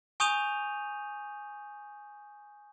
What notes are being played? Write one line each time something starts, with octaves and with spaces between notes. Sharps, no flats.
G#5 C#6 D#6 G6 D#7 F7